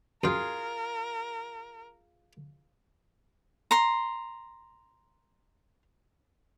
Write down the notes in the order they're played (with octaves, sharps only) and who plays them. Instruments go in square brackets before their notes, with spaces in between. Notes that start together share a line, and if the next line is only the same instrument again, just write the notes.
[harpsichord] F#2 G5 [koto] F4 G#4 [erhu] A#4
[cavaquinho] A#5 C6